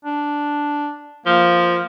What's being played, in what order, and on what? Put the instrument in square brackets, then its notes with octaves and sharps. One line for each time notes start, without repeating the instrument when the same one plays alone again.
[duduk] D4
[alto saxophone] F3 [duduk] A#3